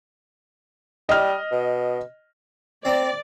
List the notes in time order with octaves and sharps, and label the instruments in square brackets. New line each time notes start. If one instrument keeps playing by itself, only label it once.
[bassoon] G3 [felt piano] D#5 F6
[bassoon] B2
[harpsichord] C4 A#5 [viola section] D5